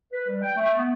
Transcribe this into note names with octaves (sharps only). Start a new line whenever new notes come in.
B4
G3
G5
A3
B3